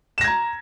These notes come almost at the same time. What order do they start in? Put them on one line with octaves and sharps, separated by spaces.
E7 A#6 G#6 A#5